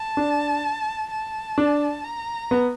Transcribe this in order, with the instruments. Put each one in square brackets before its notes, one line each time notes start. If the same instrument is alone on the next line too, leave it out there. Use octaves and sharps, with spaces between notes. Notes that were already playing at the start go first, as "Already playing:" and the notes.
Already playing: [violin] A5
[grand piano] D4
[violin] A5
[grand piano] D4
[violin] A#5
[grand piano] B3